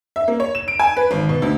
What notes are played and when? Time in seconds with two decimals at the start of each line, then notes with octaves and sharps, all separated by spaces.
0.16 E5
0.28 A#3
0.40 C#5
0.55 E7
0.68 D7
0.79 G#5
0.97 B4
1.11 G#1
1.29 B2
1.42 D2